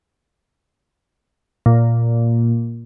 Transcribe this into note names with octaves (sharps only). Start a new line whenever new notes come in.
A#2